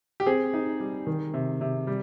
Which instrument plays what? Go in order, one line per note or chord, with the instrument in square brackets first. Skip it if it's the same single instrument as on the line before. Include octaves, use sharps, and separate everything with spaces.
[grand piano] G4
C4 G#4
D#4
G3
D#3
C3
C3
G3